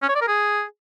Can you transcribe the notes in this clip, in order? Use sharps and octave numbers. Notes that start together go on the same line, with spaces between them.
C#4
C#5
D5
A#4
G#4